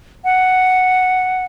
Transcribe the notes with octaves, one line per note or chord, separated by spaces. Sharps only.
F#5